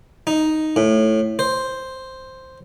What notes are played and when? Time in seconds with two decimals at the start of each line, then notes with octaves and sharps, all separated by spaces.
0.27 D#4
0.76 A2
1.39 C5